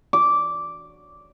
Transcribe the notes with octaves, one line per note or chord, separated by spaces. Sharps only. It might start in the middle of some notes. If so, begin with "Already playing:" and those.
D6